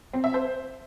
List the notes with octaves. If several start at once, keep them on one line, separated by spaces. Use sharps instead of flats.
C4
E5
C5